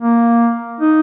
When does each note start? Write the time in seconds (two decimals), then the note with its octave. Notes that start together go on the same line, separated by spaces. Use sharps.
0.02 A#3
0.81 D#4